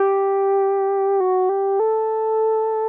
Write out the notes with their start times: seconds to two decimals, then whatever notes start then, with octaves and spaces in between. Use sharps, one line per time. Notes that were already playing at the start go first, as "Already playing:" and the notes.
Already playing: G4
1.20 F#4
1.49 G4
1.80 A4